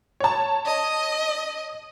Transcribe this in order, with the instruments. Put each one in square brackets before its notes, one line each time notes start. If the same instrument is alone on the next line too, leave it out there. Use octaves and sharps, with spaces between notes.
[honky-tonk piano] C#5 A5
[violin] D#5